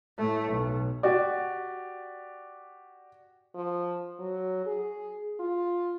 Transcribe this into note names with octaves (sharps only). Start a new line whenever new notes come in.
A2 A3
B1
F#4 G4 D5
F3
F#3
G#4
F4